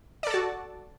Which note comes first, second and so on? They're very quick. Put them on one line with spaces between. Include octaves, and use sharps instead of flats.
D5 A4 A5 F#4